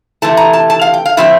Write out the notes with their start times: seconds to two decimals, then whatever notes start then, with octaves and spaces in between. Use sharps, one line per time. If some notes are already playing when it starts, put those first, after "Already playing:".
0.22 C3 E3 A3 A5
0.37 A#5
0.53 A5
0.70 A5
0.81 F5
0.94 G5
1.05 F5
1.17 A2 F3 C4 E5